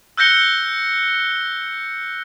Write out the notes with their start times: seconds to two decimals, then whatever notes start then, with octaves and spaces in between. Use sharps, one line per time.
0.17 E6 F#6 G6 A#6 C#7 G7